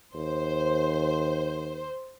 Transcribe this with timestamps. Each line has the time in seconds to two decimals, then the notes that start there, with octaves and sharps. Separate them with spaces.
0.14 D#2 C5